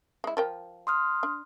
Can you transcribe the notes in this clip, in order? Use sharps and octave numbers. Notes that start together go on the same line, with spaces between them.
G#3 E4
F3 A#4 G5
C6 D#6 F6
D4